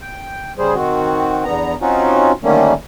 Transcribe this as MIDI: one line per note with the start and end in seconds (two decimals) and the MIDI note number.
0.02 0.52 79
0.58 0.74 49
0.58 0.74 55
0.58 0.74 68
0.58 0.74 72
0.75 1.44 51
0.75 1.44 60
0.75 1.44 66
1.44 1.75 40
1.44 1.75 50
1.44 1.75 59
1.44 1.75 82
1.81 2.32 60
1.81 2.32 61
1.81 2.32 63
1.81 2.32 65
1.81 2.32 66
2.44 2.73 50
2.44 2.73 51
2.44 2.73 55
2.44 2.73 57
2.44 2.73 58
2.44 2.73 61